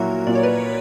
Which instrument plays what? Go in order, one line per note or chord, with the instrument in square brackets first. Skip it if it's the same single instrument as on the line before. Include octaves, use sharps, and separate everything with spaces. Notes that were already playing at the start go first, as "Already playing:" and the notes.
Already playing: [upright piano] A#2 F#3 A#3 E4 [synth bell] F#4 A#4
[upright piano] A#2 [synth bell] D5
[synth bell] C#5
B4 D5